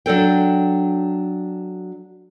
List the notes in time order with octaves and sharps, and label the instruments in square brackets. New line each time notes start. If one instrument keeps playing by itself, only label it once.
[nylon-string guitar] F#3 D4 A4 G5